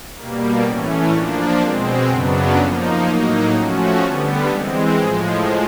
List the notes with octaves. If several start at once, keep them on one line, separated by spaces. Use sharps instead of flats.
B2 G3 A#3
A2 E3 A3 C#4
F3 A#3 D4
B2 G#3 C4
F#2 C#3 F#3 B3 D4
F3 A#3 D#4
A2 F#3 A#3 D#4
F3 A3 C#4 F#4
D3 G3 B3
E3 G#3 C4
A2 F3 G#3